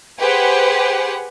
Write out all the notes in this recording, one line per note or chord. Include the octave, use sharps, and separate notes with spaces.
G4 G#4 B4 C5 F#5